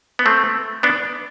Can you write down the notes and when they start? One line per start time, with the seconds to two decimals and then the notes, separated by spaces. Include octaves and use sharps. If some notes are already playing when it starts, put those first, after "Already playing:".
0.19 B3
0.26 A3 C4
0.83 B3 D4